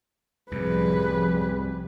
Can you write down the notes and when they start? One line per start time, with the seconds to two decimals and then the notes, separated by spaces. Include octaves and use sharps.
0.52 C2 F#2 A2 F3 G3 G#4 B4